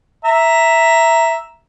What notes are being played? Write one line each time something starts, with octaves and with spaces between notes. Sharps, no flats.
E5 A#5